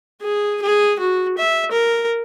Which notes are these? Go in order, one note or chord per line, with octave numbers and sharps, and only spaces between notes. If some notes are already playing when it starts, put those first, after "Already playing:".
G#4
G#4
F#4
E5
A#4